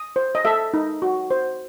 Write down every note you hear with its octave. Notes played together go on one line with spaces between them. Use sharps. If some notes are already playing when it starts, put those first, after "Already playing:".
Already playing: D#6
C5
D#5
A4 E5
D#4
F#4
C5